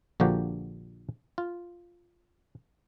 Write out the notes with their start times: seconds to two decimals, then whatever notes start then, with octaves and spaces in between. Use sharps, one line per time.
0.20 A#1 D3 F3 A#3 F#4 G4
1.38 F4